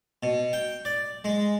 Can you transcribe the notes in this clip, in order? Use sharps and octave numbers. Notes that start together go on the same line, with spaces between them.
B2
G5
D5
G#3